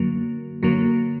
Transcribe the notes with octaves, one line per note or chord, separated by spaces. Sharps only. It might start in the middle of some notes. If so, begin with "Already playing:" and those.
Already playing: F#2 D3 F#3 A#3
F#2 D3 F#3 A#3